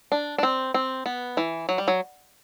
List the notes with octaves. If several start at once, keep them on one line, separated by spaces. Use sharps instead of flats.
D4
D4
C4
C4
B3
E3
F#3
G3
F#3